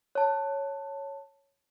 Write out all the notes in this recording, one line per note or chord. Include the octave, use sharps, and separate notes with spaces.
C#5 A5